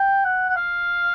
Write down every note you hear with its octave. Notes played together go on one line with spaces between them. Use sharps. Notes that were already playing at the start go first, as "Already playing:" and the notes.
Already playing: G5
F#5
F#5
F5